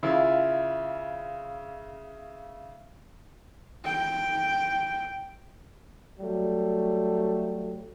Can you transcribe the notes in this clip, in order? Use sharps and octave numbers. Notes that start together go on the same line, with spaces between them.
C#3 E4 F4
G5
F#3 G3 A3